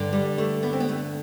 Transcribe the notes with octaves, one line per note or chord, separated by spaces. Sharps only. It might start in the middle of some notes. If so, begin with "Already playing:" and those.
Already playing: G2 D3
G3
A3
B3
C4
B3
A3